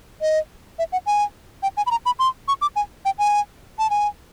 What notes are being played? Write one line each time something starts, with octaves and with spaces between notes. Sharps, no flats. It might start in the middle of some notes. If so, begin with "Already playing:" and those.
D#5
E5
F#5
G#5
G5
G#5
B5
A#5
B5
C6
C#6
D6
G#5
G5
G#5
A5
G#5